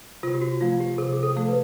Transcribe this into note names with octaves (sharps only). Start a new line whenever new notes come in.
C3 F4
G4
F#4
F3 A3 F4
G4
C3 G#4
G#4
A4
F3 A3
B4